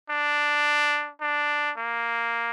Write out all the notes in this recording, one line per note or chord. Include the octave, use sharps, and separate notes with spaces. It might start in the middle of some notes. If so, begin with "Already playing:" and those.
D4
D4
A#3